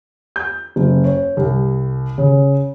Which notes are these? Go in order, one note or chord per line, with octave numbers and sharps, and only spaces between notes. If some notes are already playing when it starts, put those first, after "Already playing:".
G6
F#1
C#5
C2
C#3